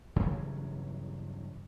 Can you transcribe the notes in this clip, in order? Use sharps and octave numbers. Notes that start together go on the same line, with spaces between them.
G2 C#3 E3 F#3